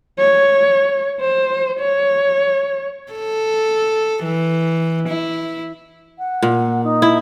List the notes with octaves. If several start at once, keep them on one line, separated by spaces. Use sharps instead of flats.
C#5
C5
C#5
A4
E3
E4
F#5
A#2
D#4
E4